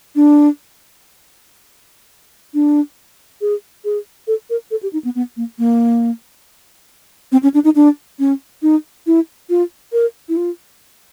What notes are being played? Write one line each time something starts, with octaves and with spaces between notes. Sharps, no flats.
D4
D4
G#4
G#4
A4
A#4
A4
G4
D#4
B3
B3
A#3
A#3
C4
C#4
D4
D#4
D4
C#4
D#4
E4
F4
A#4
E4
F4